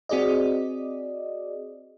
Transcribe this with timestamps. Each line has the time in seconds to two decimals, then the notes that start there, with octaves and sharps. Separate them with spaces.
0.09 C4 F#4 G#4 D5 D#5